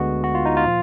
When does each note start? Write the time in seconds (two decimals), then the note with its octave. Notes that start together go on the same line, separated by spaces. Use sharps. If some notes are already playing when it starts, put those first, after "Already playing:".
Already playing: D2 D3 G#3 B3 F#4
0.24 F#4
0.35 F4
0.45 D#4
0.57 F4
0.65 A#2 F3